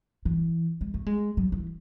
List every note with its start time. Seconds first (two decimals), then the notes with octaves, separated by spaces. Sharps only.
0.25 E3
0.81 G#3
0.94 A3
1.06 G#3
1.37 F#3
1.52 E3